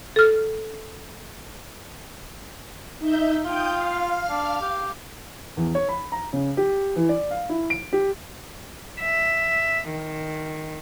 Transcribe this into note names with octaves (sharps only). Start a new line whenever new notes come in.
A4 F6
D#4 E5 G6
F4 G5 D#6 G6
F5 F6
D4
G4
E2
C#5
B5
A#5
C#3
G4
E3
D5
F5
E4
D7
G4
E5
D#3